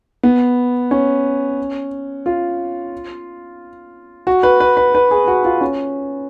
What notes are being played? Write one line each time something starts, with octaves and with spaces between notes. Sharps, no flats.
B3
C#4
F4
F#4
B4
B4
B4
B4
G#4
F#4
F4
C#4